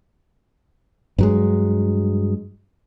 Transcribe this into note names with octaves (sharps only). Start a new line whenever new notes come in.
G2 F#3 G#3